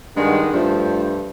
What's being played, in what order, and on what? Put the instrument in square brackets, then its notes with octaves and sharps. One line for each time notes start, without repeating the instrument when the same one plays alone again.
[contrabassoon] G2 [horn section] D#3 G#3 F#5
[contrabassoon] G2 [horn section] F3 A3 C5